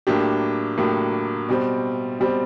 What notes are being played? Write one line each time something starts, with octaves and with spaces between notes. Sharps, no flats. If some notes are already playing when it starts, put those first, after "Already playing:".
A2 F#3 A#3 D4 G4
A2 F#3 A#3 D4 G4
B2 G3 C4
B2 G3 C4